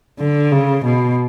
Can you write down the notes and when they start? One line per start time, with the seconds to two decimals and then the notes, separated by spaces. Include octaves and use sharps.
0.19 D3
0.52 C#3
0.85 B2